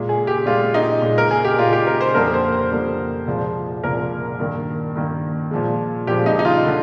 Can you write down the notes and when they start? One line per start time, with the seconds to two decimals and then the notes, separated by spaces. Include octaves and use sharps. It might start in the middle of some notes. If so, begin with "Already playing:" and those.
Already playing: A#2 G#3
0.09 G#4
0.27 G4
0.46 A#2 G#3 F4
0.74 D#4
1.02 A#2 G#3
1.18 A#4
1.31 G#4
1.45 G4
1.58 A#2 G#3 F4
1.73 G4
1.87 A#4
2.01 C5
2.15 F2 D3 G3 A#3 A#4
2.34 C5
2.52 C5
2.71 F2 D3 G3 A#3
3.26 C2 A#2 F3 G#3
3.83 C2 A#2 F3 G#3 A#4
4.39 G2 D#3 A#3
4.96 G2 D#3 A#3
5.51 A#2 F3 G#3
6.07 A#2 F3 G#3 G4
6.26 D#4
6.39 D#4
6.45 F4
6.64 D3 G3